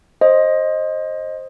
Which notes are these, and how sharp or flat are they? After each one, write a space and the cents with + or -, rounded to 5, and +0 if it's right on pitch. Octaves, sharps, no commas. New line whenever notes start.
C5 +20 D#5 +0